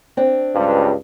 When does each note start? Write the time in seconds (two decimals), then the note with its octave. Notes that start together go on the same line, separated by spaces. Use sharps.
0.17 C4 D4
0.56 C#2 G2